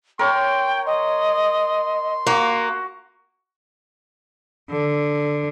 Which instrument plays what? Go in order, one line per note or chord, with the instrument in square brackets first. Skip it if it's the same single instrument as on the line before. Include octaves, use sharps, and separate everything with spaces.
[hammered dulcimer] A#4 C#5 [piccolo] G5 [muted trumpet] C6
[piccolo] D#5 [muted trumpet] C6
[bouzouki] A#3 [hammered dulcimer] F#4
[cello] D3